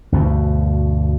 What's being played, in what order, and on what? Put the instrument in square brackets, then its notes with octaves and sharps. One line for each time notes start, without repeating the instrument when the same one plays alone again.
[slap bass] D2 G2 B2